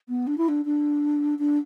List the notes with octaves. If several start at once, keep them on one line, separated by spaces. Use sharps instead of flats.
B3
D4
E4
D4
D4
D4